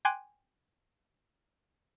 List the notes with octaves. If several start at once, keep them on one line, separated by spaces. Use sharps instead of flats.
G5 G#5 C6 D6 F#6 G#6